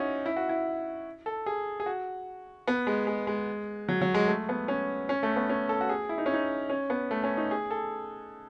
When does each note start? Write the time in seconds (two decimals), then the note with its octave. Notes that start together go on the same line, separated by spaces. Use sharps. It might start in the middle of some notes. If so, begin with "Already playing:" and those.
Already playing: C#4 D#4 E4 F#4
0.26 E4
0.36 F#4
0.49 E4
1.26 A4
1.46 G#4
1.80 G#4
1.86 F#4
2.68 B3
2.87 G#3
3.07 G#3
3.27 G#3
3.89 F#3
4.02 F#3
4.14 G#3
4.28 A3
4.49 B3
4.68 C#4
5.09 C#4
5.23 A3
5.36 B3
5.49 C#4
5.69 A4
5.81 F#4
5.89 G#4
6.09 E4
6.18 D#4
6.26 C#4
6.34 D#4
6.70 C#4
6.90 B3
7.11 A3
7.24 C#4
7.37 D#4
7.51 G#4
7.71 A4